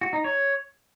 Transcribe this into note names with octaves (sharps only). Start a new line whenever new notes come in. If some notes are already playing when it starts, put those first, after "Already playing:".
F#4
D#4
C#5